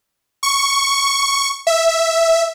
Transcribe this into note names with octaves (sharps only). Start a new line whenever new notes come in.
C#6
E5